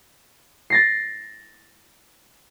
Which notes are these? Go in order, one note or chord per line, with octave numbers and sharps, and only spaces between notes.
A6 A#6 C7